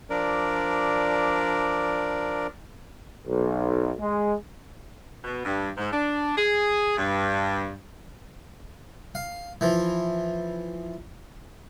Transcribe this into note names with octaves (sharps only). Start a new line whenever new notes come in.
F3 D4 A#4 D5
B1
G#3
B2
G2
G#2
D4
G#4
G2
F5
E3 F3